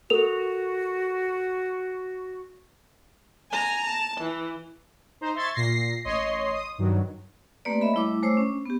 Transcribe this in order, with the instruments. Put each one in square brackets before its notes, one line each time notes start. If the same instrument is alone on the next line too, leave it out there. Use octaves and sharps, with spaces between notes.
[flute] F#4 [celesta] A4 A#4 F7
[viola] G#5 A#5
A5
E3
[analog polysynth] D#4 C5 A#5
E5 C6 C#6 G#6 A6
A#2 A#6 C7
A1 C#5 D#5 C6 C7
D#6
G2 D#3 F#3
[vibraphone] A3 A#3 C4 G4 B4 D5
C#5 D#5 E5 B5
G3 A3 E4 D6 E6
G#3 A3 C5 C#5 D6 E6
C#4 D4
B3 G4